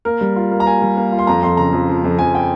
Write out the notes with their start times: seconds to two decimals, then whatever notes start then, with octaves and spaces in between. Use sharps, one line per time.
0.05 A#3 A#4
0.21 G3
0.36 F4
0.52 A#3
0.60 A#5
0.66 A#3 G#5
0.82 G3
0.97 A#3
1.12 F4
1.19 C6
1.27 F2 A#5
1.43 F2 C6
1.57 C#3 A#5
1.73 F2
1.89 F3
2.04 F2
2.19 F2 G#5
2.35 G5